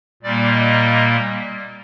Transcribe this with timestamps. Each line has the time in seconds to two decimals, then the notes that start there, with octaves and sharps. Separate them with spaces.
0.22 A#2 G3 A#3 D5
0.52 D#5